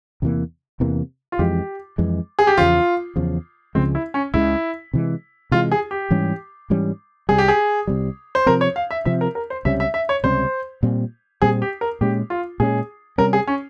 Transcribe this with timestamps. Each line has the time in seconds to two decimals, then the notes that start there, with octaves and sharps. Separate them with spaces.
0.22 E2 C3 E3 A#3
0.80 E2 C3 E3 A#3
1.32 F4
1.39 F2 E3 G#3 G4
1.98 F2 E3 G#3
2.39 G#4
2.47 G4
2.57 E2 C#3 F3 F4
3.16 E2 C#3 F3
3.75 C#2 C#3 F3 G#3 C4
3.95 E4
4.14 C#4
4.34 C#2 C#3 F3 G#3 E4
4.93 C3 E3 G#3
5.51 C3 E3 G#3 F4
5.72 G#4
5.91 G4
6.10 G#2 E3 G3 C#4
6.70 G#2 E3 G3 C#4
7.29 C2 C3 G3 G#4
7.38 G4
7.48 G#4
7.87 C2 C3 G3
8.35 C5
8.46 C3 F3 C4 A#4
8.61 C#5
8.76 F5
8.91 E5
9.05 C3 F3 C4 E5
9.21 A#4
9.35 A#4
9.50 C5
9.65 C#2 C3 G3 C#4 E5
9.80 E5
9.94 E5
10.09 C#5
10.24 C#2 C3 G3 C#4 C5
10.83 A#2 G3 C4
11.42 A#2 G3 C4 G#4
11.62 G4
11.81 A#4
12.01 A#2 G#3 C#4 G4
12.30 F4
12.60 A#2 G#3 C#4 G#4
13.18 C3 G3 C#4 A#4
13.33 G#4
13.47 C#4